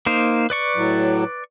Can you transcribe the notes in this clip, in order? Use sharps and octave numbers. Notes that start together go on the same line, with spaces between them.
A#3 D#4 C5
B4 D5 C#6
A2 F#3